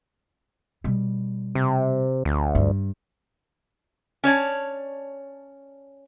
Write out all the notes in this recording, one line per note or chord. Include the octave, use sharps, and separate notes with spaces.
B2 G3
C3
D2
G2
C#4 C#5 D5 A5